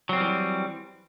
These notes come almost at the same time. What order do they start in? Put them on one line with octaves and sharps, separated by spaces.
F#3 C4 G3 E3